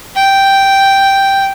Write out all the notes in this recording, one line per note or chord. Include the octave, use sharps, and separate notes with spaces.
G5